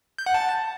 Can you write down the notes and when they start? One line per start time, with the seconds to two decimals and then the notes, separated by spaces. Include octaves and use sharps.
0.19 G6
0.26 F#5
0.34 A5